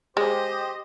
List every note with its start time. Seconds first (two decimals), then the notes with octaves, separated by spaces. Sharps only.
0.17 G#3 G4 C5 D#5